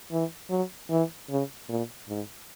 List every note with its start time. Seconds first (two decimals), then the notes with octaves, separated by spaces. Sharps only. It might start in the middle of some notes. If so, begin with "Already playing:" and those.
0.12 E3
0.50 F#3
0.90 E3
1.30 C#3
1.69 A#2
2.09 G#2